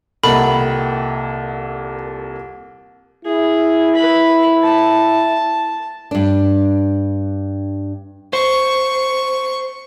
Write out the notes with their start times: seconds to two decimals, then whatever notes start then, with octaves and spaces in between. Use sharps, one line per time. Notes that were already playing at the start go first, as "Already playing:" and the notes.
0.24 C2 A#2 D#3 B3 A4 B5
3.25 E4 G#4
3.96 B4 B5
4.62 A5
6.11 G2 D4
8.33 C5 C#6